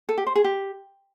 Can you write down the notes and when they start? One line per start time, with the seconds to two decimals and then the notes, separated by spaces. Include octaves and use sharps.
0.09 A4
0.18 G4
0.27 C5
0.35 G#4
0.44 G4